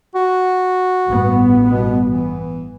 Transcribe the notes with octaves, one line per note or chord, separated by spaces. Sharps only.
F#4
A1 G2 B3
B2
E3